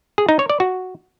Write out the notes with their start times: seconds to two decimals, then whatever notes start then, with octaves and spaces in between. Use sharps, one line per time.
0.18 G#4
0.29 D#4
0.39 C#5
0.50 D5
0.60 F#4